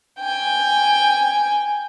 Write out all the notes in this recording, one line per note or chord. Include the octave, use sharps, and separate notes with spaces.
G5 G#5